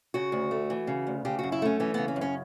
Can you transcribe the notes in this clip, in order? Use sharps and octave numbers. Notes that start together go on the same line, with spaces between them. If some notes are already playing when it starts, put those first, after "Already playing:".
C#3 F#4
D2
A3
E3
C#3
D2
C#3 G4
F#2 F#4
E4
A3 C#4
E3 C#4
C#3 B3
C#4
F#2
C#4